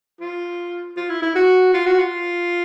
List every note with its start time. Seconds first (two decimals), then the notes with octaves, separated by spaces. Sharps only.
0.20 F4
0.97 F4
1.10 E4
1.22 E4
1.35 F#4
1.74 F4
1.86 F#4
1.99 F4